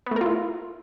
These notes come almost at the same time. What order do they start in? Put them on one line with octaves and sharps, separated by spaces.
B3 A3 A#4 F4 E4